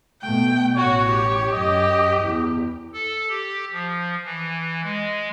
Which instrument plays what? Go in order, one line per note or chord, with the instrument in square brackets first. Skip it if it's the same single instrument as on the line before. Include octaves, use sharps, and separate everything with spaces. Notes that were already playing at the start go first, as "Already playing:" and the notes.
[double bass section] B2 A3 [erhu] G5
[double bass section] A1 [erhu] F#4 [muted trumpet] C#5
[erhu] G4
[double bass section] F#2 [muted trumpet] D#5
[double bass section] E2
[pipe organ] A4
G4
F3
E3
G#3